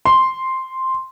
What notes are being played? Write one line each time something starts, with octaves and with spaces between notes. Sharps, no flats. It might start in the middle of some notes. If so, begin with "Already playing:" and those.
C6